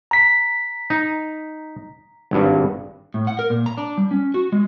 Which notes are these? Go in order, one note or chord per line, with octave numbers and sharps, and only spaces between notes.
A#5 B6
D#4
G#1 G2
A2
F#5
A#4
A#2
A#5
D4
G3
C#4
F#4
G#3